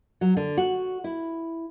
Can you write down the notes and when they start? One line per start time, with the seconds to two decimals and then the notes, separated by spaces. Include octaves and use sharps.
0.21 F#3
0.37 D3
0.57 F#4
1.04 E4